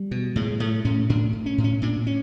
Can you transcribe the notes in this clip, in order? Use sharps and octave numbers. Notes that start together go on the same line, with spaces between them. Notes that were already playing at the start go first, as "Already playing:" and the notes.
Already playing: G3
B2
A2 G#3
A2 A3
A2 C#4
A2 D4
A2
C#4
A2
C#4
A#2 D4
C#4